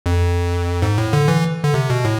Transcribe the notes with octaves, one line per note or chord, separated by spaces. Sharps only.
F2
G#2
A2
D3
E3
D3
C3
B2
A2